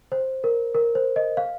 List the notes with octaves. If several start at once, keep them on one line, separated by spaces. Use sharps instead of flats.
C5
A#4
A#4
C5
D#5
F5